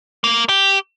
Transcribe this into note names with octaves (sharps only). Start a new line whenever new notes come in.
A#3
G4